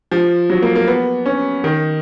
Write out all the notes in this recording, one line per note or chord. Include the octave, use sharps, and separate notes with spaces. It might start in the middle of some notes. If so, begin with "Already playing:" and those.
F3
F#3
A#3
A#3
B3
C#4
D#3